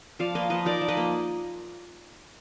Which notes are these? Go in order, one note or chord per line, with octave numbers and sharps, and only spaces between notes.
F3 D5 F5
A#3 B4 D#5
F3 B4 D#5
D#4 A#4 D5
F3
B4 D#5
A#3